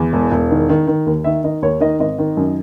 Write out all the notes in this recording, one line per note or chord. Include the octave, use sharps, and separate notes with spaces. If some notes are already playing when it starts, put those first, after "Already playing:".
Already playing: E2
E1
E1
D#3
D#3
D#3
D#2
D#3 E5
D#3 D#5
D#2 C#5
D#3 D#5
G#1 D#5
D#3
F#2